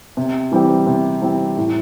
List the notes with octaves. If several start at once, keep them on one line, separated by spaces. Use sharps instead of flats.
C3
E3 G3 C4 G4
C3
E3 G3 C4 G4
A2